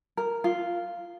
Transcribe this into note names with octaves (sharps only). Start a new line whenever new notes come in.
A#4
F4